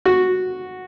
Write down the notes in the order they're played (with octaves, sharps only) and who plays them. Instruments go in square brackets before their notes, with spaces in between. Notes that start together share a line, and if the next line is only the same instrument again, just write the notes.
[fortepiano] F#4